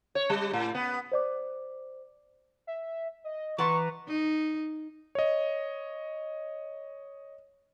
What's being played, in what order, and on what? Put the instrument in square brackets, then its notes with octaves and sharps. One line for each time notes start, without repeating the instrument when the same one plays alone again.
[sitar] C#5
G3
A2
B3
[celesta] C5 D5 D6
[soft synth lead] E5
D#5
[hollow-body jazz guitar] E3 F#5 C6 [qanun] B4 D5 A5 [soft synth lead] A#5 [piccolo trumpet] C#6
[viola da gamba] D#4
[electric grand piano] C#5 D#5